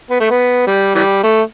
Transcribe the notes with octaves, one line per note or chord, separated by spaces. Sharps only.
B3
A3
B3
G3
E3 G3
A3